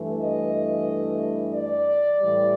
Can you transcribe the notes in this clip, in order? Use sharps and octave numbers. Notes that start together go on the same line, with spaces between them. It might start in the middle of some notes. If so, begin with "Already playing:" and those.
Already playing: G2 E3 A3
D#5
D5
A2 E3 G3